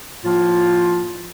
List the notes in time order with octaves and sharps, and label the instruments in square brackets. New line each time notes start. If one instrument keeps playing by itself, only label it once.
[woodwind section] A2 F3 A#3 F4